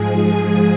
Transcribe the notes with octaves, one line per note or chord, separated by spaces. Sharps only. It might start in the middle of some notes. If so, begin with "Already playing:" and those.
Already playing: G#2 F3 G#3 G#4 G#5